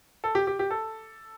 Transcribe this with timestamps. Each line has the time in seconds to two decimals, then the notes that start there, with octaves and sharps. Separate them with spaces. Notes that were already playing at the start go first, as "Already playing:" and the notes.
0.24 A4
0.35 G4
0.47 G4
0.59 G4
0.70 A4